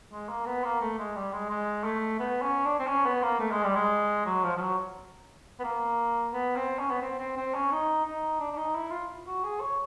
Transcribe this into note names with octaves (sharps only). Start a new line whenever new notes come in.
G#3
A#3
B3
A#3
A3
G#3
G3
G#3
G#3
A3
B3
C#4
D4
C4
C#4
B3
A#3
A3
G#3
G3
G#3
F#3
F3
F3
F#3
B3
A#3
B3
C4
C#4
B3
C4
C4
C4
C#4
D#4
D#4
D4
D4
D#4
E4
F4
F#4
G#4
C#5